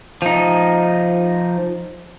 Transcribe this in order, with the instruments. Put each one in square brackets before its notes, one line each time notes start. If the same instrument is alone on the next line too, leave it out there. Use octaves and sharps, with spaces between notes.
[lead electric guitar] F3 D#4